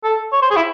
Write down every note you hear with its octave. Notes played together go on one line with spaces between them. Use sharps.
A4
C#5
C5
G#4
E4